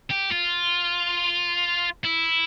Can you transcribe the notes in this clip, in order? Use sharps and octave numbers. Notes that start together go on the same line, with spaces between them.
G4
F4
E4